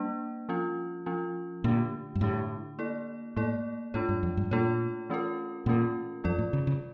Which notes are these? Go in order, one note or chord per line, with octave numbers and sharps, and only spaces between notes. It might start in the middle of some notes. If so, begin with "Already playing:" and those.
Already playing: G3 A#3 D4
F3 C#4 F4
F3 C#4 F4
A#2 D3 A3 D4 G4
G2
A2 D3 A3 D4 G4
A#3 E4 A4 D5
A2 A#3 E4 A4 D5
A2 A3 D4 F4 A4 C#5
G2
F2
G2
A#2 A3 D4 F4 A4 C#5
E3 A3 C#4 F4 A#4
A#2 E3 A3 C#4 F4 A#4
F2 G3 C#4 F4 A4 D5
A2
C#3
C#3